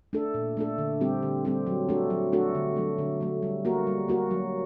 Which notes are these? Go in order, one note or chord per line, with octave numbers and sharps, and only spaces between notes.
A3 D4 A4
A#2
A3 D4 A4
D3
G3 C4 G4
D3
G3 C4 G4
F#3
A3 D4 F#4 A4
F#3
A3 D4 F#4 A4
D3
F#3 A3
D3
F#3 A3
G3
A#3 F#4 A#4
G3
A#3 F#4 A#4
F#3